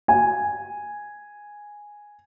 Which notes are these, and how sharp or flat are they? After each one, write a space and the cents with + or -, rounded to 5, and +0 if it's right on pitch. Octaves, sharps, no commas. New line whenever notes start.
G#5 -5